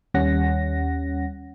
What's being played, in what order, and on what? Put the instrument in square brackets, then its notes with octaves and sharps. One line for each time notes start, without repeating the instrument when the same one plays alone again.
[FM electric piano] D#2 G3 C#4 F#5 A#6